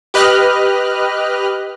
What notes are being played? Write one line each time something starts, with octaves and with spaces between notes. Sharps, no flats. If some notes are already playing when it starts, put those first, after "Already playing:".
G4 B4 D#5 F6 F#6